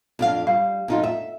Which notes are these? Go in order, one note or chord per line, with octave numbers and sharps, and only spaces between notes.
F2 D4 F5
G3 F5
F2 D#4 F4
E5